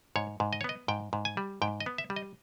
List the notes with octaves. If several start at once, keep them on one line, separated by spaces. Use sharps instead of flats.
G#2 C#5
G#2
D#5
C#5
B3 D#5
G#2 G5
G#2
G#5
G3
G#2 G5
D#5
B3
E5
G3
D#5